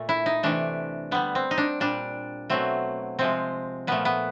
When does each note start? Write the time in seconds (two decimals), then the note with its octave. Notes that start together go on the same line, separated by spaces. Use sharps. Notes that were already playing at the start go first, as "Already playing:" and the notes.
Already playing: A#2 A3
0.09 E4
0.26 D#4
0.43 C3 E3 A3 D4
1.11 D3 G3 B3
1.35 C4
1.51 D#4
1.58 D4
1.80 A#2 G3 D4
2.50 B2 F#3 A3 C4
3.19 C3 F3 G#3 C4
3.87 A#2 F3 A3 B3
4.05 B3